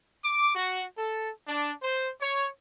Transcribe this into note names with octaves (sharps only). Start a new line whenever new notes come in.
D6
F#4
A4
D4
C5
C#5